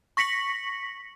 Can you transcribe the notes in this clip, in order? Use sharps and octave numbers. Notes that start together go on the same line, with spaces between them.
C#6 A#6 B6 C#7 F#7